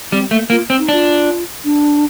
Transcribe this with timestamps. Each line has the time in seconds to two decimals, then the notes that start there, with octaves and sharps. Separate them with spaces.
0.12 G3 C4
0.31 A3 A#3
0.50 A#3 F4
0.70 C4
0.79 D#4
0.89 D4 F4
1.65 D4